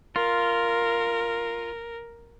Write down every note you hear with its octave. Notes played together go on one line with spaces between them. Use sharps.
F4 A#4